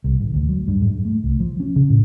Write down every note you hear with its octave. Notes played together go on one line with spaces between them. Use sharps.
C2
G#1
D2
F#3
G2
G#2
A3
C2
F3
C#4
C#3
A2